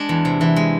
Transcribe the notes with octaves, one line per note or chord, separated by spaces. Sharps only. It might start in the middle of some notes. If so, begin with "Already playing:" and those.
Already playing: G#3 D4
E2
C3
E3
G#3